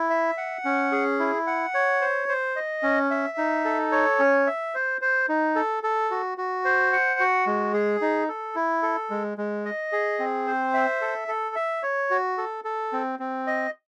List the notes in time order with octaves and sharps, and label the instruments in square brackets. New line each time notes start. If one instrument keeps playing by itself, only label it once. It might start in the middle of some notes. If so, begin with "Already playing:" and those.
Already playing: [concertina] E4
E5
F#5
C#4
G#4
E4
F#5
C#5
C5
C5
D#5
C#4
E5
D#4
A4
C#5
C#4
E5
C5
C5
D#4
A4
A4
F#4
F#4
C5
F#5
F#4
G#3
G#4
D#4
A4
E4
A4
G#3
G#3
D#5
G#4
C4
C5
E5
A4
A4
E5
C#5
F#4
A4
A4
C4
C4
D#5